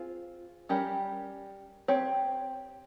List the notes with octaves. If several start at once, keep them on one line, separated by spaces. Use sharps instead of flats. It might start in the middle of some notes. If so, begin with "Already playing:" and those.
Already playing: C4 F4 G#4
G3 C#4 G4 A#4
C4 G4 C#5